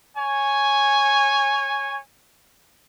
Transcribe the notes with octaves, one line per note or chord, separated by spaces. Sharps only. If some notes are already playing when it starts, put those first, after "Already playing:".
C#5 G#5